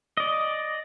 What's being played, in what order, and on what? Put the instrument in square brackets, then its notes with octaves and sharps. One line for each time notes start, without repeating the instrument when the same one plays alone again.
[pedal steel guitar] D5 D#5